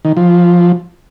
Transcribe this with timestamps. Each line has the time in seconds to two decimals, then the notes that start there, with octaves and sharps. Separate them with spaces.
0.05 D#3
0.17 F3